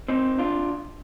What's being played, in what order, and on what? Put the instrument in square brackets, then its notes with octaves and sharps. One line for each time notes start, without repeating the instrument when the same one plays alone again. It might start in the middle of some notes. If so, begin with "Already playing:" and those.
[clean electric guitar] C4 D#4
D4 F4